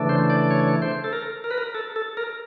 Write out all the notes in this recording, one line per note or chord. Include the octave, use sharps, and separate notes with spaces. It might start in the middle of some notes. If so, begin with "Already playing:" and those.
Already playing: C#3 E3 A3 D4
C5
D5
C#5
C5
A4
A#4
A#4
B4
A#4
A4
A4
A#4